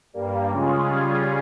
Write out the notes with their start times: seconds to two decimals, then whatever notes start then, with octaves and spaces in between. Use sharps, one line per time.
0.14 G2 G3 A#3
0.50 C#3 G#3 C#4 F4 G#4
0.87 C#3 G3 C#4 F4 G#4